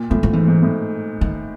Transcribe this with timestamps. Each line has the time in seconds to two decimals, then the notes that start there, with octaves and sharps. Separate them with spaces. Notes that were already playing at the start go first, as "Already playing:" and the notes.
Already playing: A#2
0.10 A2 F3
0.23 F3
0.33 G#2 E3
0.48 G#2
0.62 A2
1.21 D#3